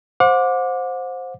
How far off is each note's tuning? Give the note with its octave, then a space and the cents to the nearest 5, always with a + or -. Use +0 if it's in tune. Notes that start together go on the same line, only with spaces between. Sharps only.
C5 +5 F#5 -40 D6 +0